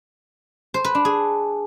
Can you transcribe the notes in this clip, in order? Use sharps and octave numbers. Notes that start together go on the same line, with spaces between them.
C5
B4
D4
G#4